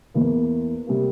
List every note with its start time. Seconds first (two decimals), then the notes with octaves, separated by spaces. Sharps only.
0.14 E2 E3 A#3
0.87 C3 G3 A#3